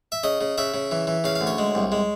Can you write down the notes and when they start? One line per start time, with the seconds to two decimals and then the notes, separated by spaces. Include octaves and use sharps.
0.12 E5
0.23 C#3 D#5
0.41 C#3
0.58 C#3 E5
0.74 C#3
0.92 E3
1.07 E3
1.24 C#3 F5
1.36 F5
1.41 D2
1.47 C#5
1.58 G#3
1.75 C2
1.92 G#3